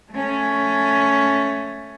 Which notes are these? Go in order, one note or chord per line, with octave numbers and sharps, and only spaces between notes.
A3 C#4